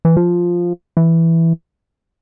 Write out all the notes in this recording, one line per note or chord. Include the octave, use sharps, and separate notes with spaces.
E3
F3
E3